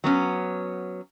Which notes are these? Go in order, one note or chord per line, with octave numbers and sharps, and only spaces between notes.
F#3 B3 C#4